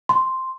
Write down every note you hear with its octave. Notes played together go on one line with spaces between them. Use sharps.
C6